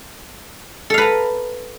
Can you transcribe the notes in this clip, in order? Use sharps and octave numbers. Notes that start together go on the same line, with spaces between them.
A4 B4 F5 A#5